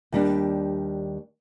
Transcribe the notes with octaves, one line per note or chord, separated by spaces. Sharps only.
D#2 G3 D4